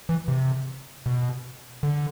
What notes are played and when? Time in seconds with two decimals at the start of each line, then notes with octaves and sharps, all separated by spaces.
0.09 E3
0.28 C3
1.06 B2
1.83 D3